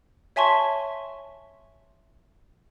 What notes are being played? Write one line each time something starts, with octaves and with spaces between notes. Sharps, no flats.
C#5 E5 G#5 A5 C6 C#6